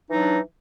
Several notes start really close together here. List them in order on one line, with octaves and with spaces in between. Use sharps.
E3 D#4 F#3 D4